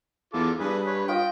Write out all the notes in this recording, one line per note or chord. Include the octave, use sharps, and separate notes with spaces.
E2 F4 A4 D6
G2 G#4 B4
B4 C#5
F4 D#5 G5